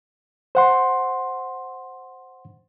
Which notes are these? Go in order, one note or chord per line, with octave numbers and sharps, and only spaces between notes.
C5 F#5 C6